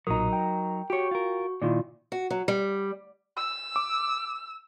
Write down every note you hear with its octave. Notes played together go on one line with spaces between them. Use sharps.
B1 A#2 F#3 D#4 A#4 A#5 D#6
G5
F#4 G4 C#5 C#6
F4 A#4
A#2 D#3 E4 F4 D5
F#4
F#3
G3
E6
D6